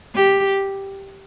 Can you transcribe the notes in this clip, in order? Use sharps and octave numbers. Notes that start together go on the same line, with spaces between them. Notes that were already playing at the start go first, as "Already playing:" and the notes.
G4